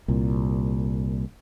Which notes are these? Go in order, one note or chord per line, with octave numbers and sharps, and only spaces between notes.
C2 A#2